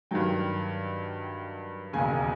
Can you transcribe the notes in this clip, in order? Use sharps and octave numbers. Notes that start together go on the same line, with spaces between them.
G2 D#3 F#3 G5
E1 D#2 C#3 G#5